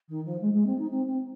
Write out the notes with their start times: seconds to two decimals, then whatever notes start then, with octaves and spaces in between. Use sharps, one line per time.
0.09 D#3
0.25 F3
0.41 G#3
0.53 G#3
0.66 C4
0.78 D#4
0.90 C4
1.06 C4